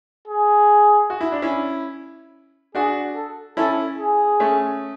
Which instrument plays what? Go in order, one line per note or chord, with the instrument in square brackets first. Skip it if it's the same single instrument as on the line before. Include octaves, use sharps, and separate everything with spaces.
[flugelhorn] G#4
[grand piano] F#4
E4
D4
C#4 E4
[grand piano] D4 F#4 [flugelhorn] G#4
[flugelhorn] A4
[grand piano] C#4 E4 [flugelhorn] A4
[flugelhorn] G#4
[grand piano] A3 C#4